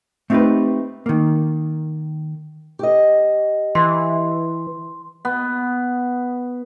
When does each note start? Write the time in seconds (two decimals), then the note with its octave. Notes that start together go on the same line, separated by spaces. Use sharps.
0.30 A3 C4 D#4 F#4 G4 B4
1.06 D#3 A#3
2.79 G4 D#5
3.75 E3 C6
5.25 B3